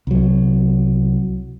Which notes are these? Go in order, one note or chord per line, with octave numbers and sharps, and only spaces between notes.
C2 F#3